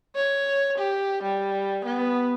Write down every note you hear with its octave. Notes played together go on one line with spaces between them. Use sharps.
C#5
G4
G3
B3